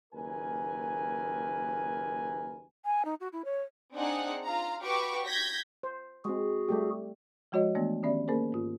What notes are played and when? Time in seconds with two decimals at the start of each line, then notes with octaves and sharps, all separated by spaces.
0.13 F#1 D#2 A#4 B4 G#5
2.85 G#5
3.05 D#4
3.20 F#4
3.32 E4
3.45 C#5
3.94 C4 D4 D#4 G#4 F#5
4.44 F4 F5 A#5
4.82 F#4 G4 B4 C#6 D6
5.26 G6 G#6 A#6 B6
5.83 C5
6.25 G#3 C4 F#4 G#4
6.68 G3 A3 G4
7.52 F3 G#3 F#4 C#5 D#5
7.75 E3 A3 B3 D4
8.03 D#3 B3 C#4 G4 D5 E5
8.28 A#3 C#4 G#4 A#4 C5
8.52 G#2 F4